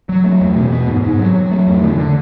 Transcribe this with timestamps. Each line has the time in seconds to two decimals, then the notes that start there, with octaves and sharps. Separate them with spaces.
0.09 F#3
0.24 A3
0.41 E2
0.56 B2
0.72 B3
0.88 G#2
1.04 G#2
1.19 F#3
1.35 F#3
1.51 A3
1.67 E2
1.83 D3
1.98 D3